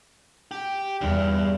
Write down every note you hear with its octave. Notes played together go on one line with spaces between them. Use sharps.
G4
E2 G2